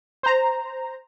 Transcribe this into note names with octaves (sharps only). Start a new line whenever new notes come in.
C5 A#5